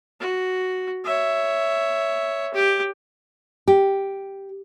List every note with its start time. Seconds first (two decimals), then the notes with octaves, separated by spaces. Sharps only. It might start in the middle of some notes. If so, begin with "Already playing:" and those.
0.20 F#4
1.05 C#5 E5
2.54 G4
3.68 G4